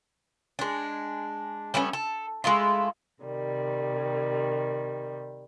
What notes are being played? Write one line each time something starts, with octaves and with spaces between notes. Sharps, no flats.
G#3 D4
G3 A3 B3 C#4
A4
G#3 A3 E4 F4
C3 D#3 G3